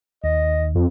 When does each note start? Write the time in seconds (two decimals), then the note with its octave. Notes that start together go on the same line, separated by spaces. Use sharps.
0.24 D#2 D#5
0.75 F2